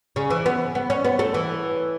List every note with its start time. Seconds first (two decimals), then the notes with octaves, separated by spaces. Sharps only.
0.16 C#3
0.30 E3
0.46 B3
0.75 B3
0.90 C#4
1.05 B3
1.19 A3
1.34 E3